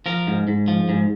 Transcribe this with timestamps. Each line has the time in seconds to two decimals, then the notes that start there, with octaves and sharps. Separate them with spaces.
0.06 F3 A#4
0.27 G#2
0.48 G#2
0.68 F3
0.89 G#2